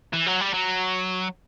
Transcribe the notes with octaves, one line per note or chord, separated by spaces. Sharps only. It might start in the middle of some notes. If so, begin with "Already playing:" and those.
E3
F#3
G3
F#3